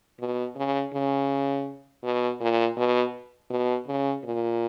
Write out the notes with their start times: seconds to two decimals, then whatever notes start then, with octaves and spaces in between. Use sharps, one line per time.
0.19 B2
0.56 C#3
0.94 C#3
2.04 B2
2.41 A#2
2.77 B2
3.50 B2
3.88 C#3
4.24 A#2